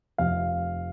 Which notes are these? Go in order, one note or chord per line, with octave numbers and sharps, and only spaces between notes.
F1 F2 C3 F5